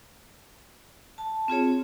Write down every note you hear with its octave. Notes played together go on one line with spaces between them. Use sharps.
A5
C4 F4 G#4 C#5